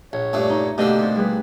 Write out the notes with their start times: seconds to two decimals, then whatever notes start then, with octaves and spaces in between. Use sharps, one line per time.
0.13 A#1 C#5
0.33 G2 A#2 A3
0.50 D#4
0.78 B2 D3 A3 A#3 G4 D#5 E6
0.99 C3 D4
1.16 G3 G#4 B4